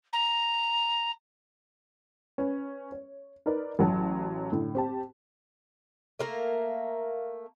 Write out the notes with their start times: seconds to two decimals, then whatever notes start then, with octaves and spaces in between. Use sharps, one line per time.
0.13 A#5
2.38 C#4 B4
2.92 C#5
3.46 D#4 A#4 B4 D5
3.79 A1 F#3 F#4 A5
4.52 A2 D3
4.75 C4 G4 A5
6.19 A3 A#3 A#4